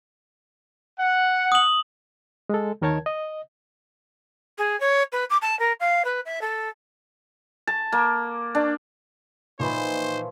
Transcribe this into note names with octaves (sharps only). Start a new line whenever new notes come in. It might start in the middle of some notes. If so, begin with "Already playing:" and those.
F#5
D#6 F#7
G#3 A4
D#2 D#3 A#4 C#5 A5 G#6
D#5
G#4
C#5
B4
D6
A5
A#4
F5
B4
E5
A4
A5
A#3
D4
A#2 E3 F3 D#4 C5 C#5 B5